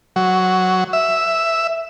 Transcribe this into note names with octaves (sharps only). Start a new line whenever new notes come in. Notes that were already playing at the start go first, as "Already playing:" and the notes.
F#3
E5